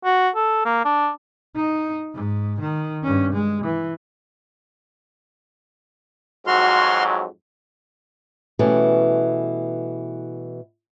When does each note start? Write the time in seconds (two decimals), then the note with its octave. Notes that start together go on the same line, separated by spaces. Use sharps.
0.05 F#4
0.35 A4
0.66 A#3
0.85 D4
1.56 D#4
2.14 G#2
2.60 D#3
3.03 G2 C#4
3.33 G#3
3.64 E3
6.47 F2 G#2 F#3 F#4 C6 F6
8.59 B2 E3 G3 A3 C#4